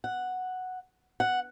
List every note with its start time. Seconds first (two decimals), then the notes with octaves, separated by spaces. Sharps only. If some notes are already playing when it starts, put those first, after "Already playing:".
0.04 F#5
1.20 F#5